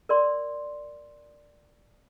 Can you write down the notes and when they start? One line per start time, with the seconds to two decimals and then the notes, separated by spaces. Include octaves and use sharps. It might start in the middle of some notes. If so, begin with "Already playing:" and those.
0.09 A#4 D5 C6